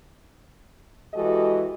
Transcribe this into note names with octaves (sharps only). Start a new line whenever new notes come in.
E3 G#3 F#4 G4 A4 D#5